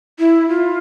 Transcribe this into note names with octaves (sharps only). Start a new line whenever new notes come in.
E4
F4